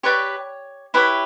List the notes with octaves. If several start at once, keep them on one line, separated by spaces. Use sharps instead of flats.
G4 B4 C#5 D5 C#6
E4 G4 B4 C#5 B5